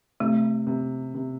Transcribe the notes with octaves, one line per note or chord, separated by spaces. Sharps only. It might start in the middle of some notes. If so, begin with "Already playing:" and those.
C3 A3
C3
C3